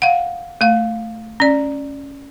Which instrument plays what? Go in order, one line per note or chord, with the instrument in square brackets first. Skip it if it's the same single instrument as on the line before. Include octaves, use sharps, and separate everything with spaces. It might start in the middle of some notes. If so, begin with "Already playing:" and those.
[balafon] F5 F#5
A3 F5
C#4 D5